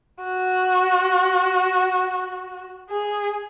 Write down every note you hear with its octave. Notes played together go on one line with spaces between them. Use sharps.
F#4
G#4